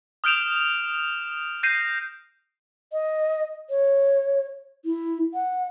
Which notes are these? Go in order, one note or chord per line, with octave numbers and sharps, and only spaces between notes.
D#6 F6 G6 D7 E7 F7
G6 A#6 C7 D#7
D#5
C#5
E4
F#5